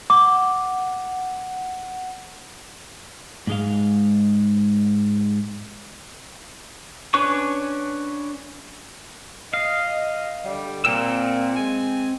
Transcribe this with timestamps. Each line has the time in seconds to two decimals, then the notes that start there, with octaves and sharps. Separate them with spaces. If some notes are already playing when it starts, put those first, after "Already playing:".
0.10 F#5 D6
3.47 G#2 G#3 F5
7.14 C#4 D4 B4 C#5 C#6
9.54 D#5 F5
10.45 D3 G3
10.85 A#2 C4 G5 E6
11.56 G#3 G#5